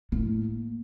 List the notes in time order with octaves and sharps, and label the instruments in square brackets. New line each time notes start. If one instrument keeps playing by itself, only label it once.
[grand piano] A2 [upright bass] A#3